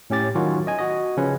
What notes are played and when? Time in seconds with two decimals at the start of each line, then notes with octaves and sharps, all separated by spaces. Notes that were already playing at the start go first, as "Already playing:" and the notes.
0.10 A2 C#4 G4 A6
0.35 D#3 F#3 C#4 D#4 F4 F#4
0.67 D#5 G#5
0.79 F#4 D#5
1.17 C#3 F3 C#4 B4